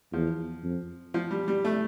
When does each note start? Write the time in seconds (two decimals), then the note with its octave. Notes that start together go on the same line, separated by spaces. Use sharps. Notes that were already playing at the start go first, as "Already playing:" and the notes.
0.13 E2 F3
0.64 F2
1.14 F3
1.31 G3
1.48 G3
1.65 A3